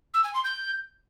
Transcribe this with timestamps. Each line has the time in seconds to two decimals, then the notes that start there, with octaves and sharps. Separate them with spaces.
0.14 E6
0.24 G#5
0.34 C6
0.44 G6